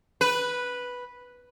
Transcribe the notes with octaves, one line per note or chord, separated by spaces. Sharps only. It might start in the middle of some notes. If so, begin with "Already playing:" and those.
B4